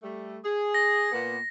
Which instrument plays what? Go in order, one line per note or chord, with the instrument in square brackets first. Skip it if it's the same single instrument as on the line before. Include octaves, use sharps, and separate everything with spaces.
[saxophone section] G3 A3
G#4
[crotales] A#6
[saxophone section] A#2 A#3 B3